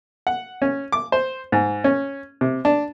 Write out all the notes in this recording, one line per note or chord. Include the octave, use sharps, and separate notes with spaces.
F#5
C#4
D6
C5
G#2
C#4
C3
D4